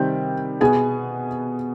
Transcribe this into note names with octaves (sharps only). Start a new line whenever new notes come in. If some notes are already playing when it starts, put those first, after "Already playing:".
Already playing: C3 D#3 G3 C4 G5
B2 B3 G#4 G#5